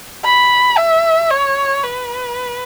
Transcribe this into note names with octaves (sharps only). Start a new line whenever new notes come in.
B5
E5
C#5
B4